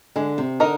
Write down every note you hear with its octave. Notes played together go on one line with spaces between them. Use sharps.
D3 G#3
C3
D3 D#4 A#4 D#5